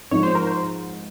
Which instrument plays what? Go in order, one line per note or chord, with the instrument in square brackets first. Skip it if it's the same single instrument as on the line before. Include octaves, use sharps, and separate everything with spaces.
[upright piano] G#2 F3 C4 D#4 [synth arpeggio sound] C#5
[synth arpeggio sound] C5
A#4
C5